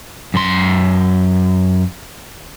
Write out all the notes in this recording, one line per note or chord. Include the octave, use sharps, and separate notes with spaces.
F#2 C6